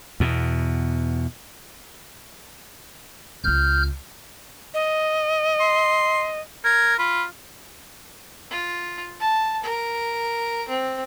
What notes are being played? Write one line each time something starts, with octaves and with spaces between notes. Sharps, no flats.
E2 B2
C#2 F4 F6 G6
D#5
C6
A#4 G#6
F4 B5
F4
A5
A#4
C4